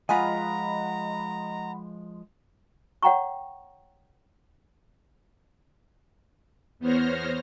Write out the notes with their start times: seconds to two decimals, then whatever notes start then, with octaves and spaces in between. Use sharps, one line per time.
0.09 F3 G#3 F4 D#5 F#5 G#5 A#5 B5
3.03 C#5 F#5 G5 A#5 C#6
6.79 E2 B3 C5 C#5 F6 A#6